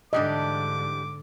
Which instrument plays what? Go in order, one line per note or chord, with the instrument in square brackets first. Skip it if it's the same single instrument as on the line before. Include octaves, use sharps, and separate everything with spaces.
[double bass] G#2 D3 [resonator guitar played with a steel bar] E3 G3 D4 [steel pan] D#5 [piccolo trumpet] D6